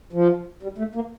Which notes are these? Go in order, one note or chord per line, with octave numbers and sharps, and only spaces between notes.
F3
G3
A3
A#3